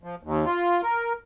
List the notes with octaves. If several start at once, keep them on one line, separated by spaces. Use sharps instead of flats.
F3
D#2
F4
A#4